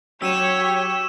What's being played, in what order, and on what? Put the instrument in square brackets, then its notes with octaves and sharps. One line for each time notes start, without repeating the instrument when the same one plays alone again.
[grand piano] F#3 [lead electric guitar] G4 [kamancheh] C#5 [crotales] E6 D#7 E7